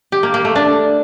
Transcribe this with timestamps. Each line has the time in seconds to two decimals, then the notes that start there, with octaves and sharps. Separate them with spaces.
0.12 G4
0.23 A#3
0.34 A#3
0.45 A3
0.56 D4